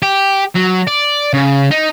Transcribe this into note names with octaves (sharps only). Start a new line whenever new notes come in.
G4
F#3
D5
C#3
D#4